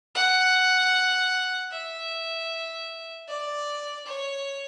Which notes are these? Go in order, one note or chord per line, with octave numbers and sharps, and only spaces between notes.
F#5
E5
D5
C#5